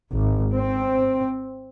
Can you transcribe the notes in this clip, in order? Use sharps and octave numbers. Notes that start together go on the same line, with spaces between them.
G#1
C4